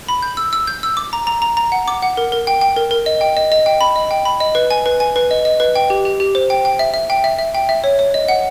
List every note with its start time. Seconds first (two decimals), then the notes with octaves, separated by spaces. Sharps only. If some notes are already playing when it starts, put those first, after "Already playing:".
0.09 B5
0.23 G6
0.37 E6
0.53 E6
0.67 G6
0.83 E6
0.97 D6
1.13 A#5
1.27 A#5
1.42 A#5
1.57 A#5
1.72 F#5
1.88 D6
2.02 F#5
2.17 A#4
2.32 A#4
2.47 G5
2.61 G5
2.76 A#4
2.91 A#4
3.06 D#5
3.21 G5
3.37 D#5
3.52 D#5
3.66 G5
3.81 B5
3.96 D#5
4.11 G5
4.25 B5
4.40 D#5
4.55 B4
4.71 G#5
4.86 B4
5.00 G#5
5.16 B4
5.31 D#5
5.45 D#5
5.60 B4
5.75 G5
5.90 G4
6.05 G4
6.20 G4
6.35 C5
6.50 G5
6.65 G5
6.79 E5
6.94 E5
7.10 G5
7.24 E5
7.39 E5
7.55 G5
7.69 E5
7.84 C#5
7.99 C#5
8.14 D#5
8.28 F#5